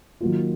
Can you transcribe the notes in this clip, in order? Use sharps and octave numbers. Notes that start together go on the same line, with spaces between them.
D#3 F#3 A#3 F4